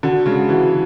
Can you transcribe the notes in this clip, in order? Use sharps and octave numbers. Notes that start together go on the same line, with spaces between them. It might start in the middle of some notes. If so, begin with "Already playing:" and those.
D3 F#4
C#3 G#3
E3 F#4